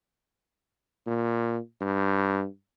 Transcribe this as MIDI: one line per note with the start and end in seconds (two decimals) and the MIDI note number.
1.07 1.58 46
1.81 2.45 43